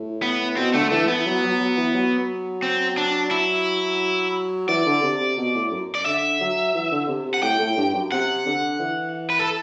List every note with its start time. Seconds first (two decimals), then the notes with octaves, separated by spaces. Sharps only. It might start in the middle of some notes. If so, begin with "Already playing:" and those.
Already playing: A2
0.22 B3
0.57 B2 C4
0.74 D3 A3
0.91 E3 A3
1.08 E3 B3
1.26 F#3
1.43 F#3
1.60 F#3
1.77 E3
1.94 F#3
2.62 C4
2.97 D4
3.31 E4
4.68 E3 D5
4.86 D3
5.02 C3
5.20 C3
5.37 B2
5.55 A2
5.71 F#2
5.95 D5
6.06 D3 E5
6.40 F#3
6.74 E3
6.91 D3
7.08 C3
7.26 C3
7.34 F#5
7.42 A2 G5
7.59 A2
7.77 G2
7.94 F#2
8.12 C3 F#5
8.46 D3
8.80 E3
9.30 B4
9.39 A4